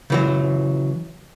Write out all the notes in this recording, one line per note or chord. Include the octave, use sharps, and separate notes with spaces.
C#3 E3 F#3